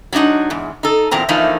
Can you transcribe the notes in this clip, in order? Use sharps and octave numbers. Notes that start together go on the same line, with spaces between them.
F#3 G#3 D4 D#4 F#5
E2 G#2
D#4 A4
E2 A#2 C4 A#5
E3 F3 A3 A#3 D4 D#4